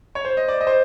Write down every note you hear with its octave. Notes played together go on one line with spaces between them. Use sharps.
C#5
C5
D#5
D5
D#5
C5